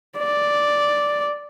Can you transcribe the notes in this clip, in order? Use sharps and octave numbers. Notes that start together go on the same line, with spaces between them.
D5